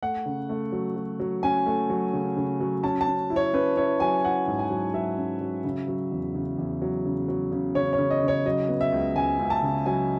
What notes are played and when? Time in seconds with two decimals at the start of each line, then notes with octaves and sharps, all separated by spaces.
0.03 A3 F#5
0.26 C#3
0.49 A3
0.72 F#3
0.96 F#3
1.20 F#3
1.43 C#4 G#5
1.66 A3
1.90 F#3
2.14 C#3
2.37 C#3
2.60 F#3
2.83 C#4 A5
3.01 A5
3.07 C#4
3.30 E4
3.36 C#5
3.53 C#4 B4
3.77 E4 C#5
4.00 F#3 G#5
4.24 E4 F#5
4.47 G#2
4.59 G#5
4.70 F#3
4.94 F#3 E5
5.18 C#4
5.41 F#3
5.64 C#3
5.88 F#3
6.11 E2
6.35 C#3
6.58 E2
6.82 F#3
7.05 C#3
7.28 F#3
7.52 C#3
7.75 C#3 C#5
7.93 C#5
7.99 C#3
8.10 D#5
8.22 C#3
8.28 C#5
8.45 F#3 D#5
8.69 B3
8.81 E5
8.92 C#2
9.15 C#2 G#5
9.39 C#2
9.50 A5
9.63 C#3
9.86 F#3 G#5